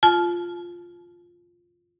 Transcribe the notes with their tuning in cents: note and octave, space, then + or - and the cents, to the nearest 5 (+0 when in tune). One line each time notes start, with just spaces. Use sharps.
F4 +0 A5 -40